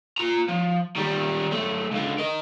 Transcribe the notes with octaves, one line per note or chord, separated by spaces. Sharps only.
F4 A#5
F3
D#3 G3
F#2 A3
C#2 D3
A#4 D#5